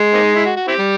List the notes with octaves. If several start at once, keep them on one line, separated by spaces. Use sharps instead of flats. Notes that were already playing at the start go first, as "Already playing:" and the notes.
Already playing: G#3
A#3 C4 D#4
E4
F#4
F#4
C4 E4 G4
G3